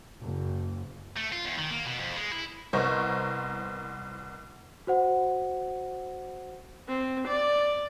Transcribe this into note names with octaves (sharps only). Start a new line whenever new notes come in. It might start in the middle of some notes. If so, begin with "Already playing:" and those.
F#1
A3
F4
E2
D#3
A#3
B2
F2
G#3
E4
C2 B3 A#4 C5 D#5 C#6
F#4 C5 F#5
C4
D5